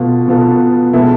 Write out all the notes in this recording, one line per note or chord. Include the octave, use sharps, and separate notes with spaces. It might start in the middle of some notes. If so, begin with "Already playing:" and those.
Already playing: B2 B3 F4 A4
B2 B3 F4 A4
B2 G#3 B3 E4 A4